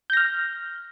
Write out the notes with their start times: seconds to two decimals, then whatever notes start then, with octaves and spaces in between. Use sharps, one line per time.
0.10 G6
0.13 A#6
0.17 F6